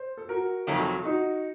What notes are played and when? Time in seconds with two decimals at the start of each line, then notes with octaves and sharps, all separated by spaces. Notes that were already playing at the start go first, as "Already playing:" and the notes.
Already playing: C5
0.17 A4
0.29 F#4 A#4
0.67 F2 C3 D#3 F#3 A3 F4 A4
1.05 D#4 F#4